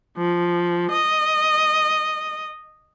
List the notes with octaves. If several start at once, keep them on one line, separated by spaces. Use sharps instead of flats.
F3
D#5